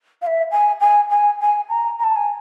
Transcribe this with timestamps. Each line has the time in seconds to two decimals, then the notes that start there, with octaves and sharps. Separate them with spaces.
0.22 F5
0.27 E5
0.52 G#5
0.80 G#5
1.10 G#5
1.40 G#5
1.70 A#5
1.99 A#5
2.04 A5
2.16 G#5